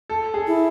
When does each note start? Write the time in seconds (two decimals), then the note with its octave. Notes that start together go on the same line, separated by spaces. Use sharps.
0.10 A4
0.34 G#4
0.47 E4